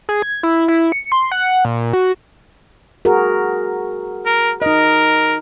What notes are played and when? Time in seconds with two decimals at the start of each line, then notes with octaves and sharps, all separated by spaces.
0.09 G#4
0.22 G#6
0.43 E4
0.68 E4
0.92 C#7
1.12 C6
1.32 F#5
1.65 A#2
1.93 F#4
3.05 F#4 G#4 A#4
4.26 A#4
4.62 D#4 A#4 D#5